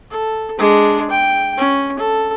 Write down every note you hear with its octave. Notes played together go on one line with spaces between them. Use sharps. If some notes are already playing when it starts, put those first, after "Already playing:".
A4
G#3 D4
G5
C#4
A4